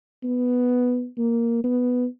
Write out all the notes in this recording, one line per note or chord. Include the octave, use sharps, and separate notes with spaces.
B3
A#3
B3